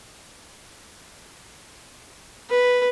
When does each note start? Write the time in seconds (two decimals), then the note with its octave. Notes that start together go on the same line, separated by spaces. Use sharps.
2.49 B4